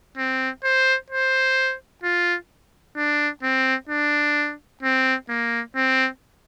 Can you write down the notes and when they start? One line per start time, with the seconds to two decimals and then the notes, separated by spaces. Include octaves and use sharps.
0.17 C4
0.64 C5
1.10 C5
2.04 F4
2.97 D4
3.43 C4
3.89 D4
4.83 C4
5.29 A#3
5.76 C4